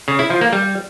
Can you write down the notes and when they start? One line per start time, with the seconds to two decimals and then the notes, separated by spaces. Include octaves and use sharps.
0.08 C#3
0.19 E4
0.30 F3
0.41 A#3
0.53 G3